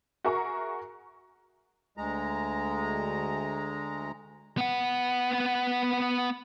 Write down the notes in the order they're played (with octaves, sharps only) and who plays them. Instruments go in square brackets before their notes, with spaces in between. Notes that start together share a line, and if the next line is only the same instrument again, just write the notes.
[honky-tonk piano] F#4 G#4 A#4 E5 A#5 C#6
[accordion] D2 G#3 A#5
[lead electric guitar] B3 F#5